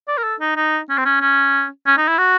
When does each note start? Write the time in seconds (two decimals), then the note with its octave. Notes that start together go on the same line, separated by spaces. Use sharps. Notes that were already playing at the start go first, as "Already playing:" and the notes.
0.08 D5
0.18 A#4
0.24 A4
0.41 D#4
0.56 D#4
0.90 C#4
0.98 C4
1.06 C#4
1.21 C#4
1.87 C#4
1.98 D#4
2.08 E4
2.18 F#4